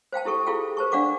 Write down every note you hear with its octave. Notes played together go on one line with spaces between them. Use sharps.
C5 F5 G5 A5
E4 G4 A4 C#6
E4 F4 G#4 A4 F5 G5
A#4 C5 A5 C#6
D4 D5 F5 F#5 C#6 D6